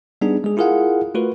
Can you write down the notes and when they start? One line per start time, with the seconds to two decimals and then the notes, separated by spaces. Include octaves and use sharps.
0.21 G3 B3 D4 D#4 G#4
0.44 G#3 G#4
0.57 E4 F4 G#4 A#4 F5 F#5
1.15 A3 F4 F#4 A#4 B4